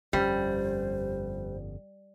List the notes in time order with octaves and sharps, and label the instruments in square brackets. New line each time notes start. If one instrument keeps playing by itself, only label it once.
[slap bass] G1 F2 C#4 [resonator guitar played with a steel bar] G3 [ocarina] C5